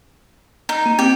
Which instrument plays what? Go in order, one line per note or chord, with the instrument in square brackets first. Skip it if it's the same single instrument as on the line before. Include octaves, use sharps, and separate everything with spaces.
[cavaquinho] D#4
[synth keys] A#3 A#5 D#7
[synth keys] C4 [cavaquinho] G4